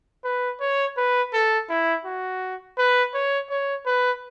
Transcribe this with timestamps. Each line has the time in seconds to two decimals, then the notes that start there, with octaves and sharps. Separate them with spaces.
0.24 B4
0.60 C#5
0.97 B4
1.33 A4
1.69 E4
2.05 F#4
2.78 B4
3.14 C#5
3.50 C#5
3.86 B4